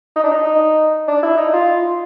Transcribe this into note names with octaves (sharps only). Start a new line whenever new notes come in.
D#4
D4
D#4
D4
E4
D#4
F4